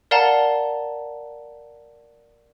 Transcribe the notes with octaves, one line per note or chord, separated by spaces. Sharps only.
A#4 D5 F5 F#5 A5 A#5